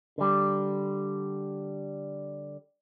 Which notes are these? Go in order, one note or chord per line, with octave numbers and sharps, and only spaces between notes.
D3 G3